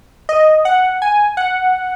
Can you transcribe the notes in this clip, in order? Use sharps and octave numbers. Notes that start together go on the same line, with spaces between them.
D#5
F#5
G#5
F#5